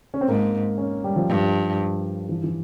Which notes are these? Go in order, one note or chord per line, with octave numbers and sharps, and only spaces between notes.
C#4
C4
G#2 A#3
C#4
G3
F3
G2
E3
E3